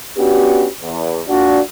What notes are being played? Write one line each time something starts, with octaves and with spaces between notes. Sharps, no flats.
B3 C#4 D4 F#4 G4
E2
A#2 D4 F#4